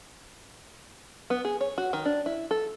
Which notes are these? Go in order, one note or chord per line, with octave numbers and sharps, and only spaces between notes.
B3
G#4
C#5
F#4
D#3
D4
E4
A4